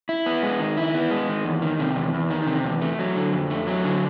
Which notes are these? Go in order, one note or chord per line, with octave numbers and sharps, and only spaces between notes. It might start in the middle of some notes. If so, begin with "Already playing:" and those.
E4
B3
G#3
D#3
E4
B3
G#3
D#3
E2
D#3
C3
E2
E2
D#3
C3
E2
A3
F#3
D3
F2
A3
F#3
D3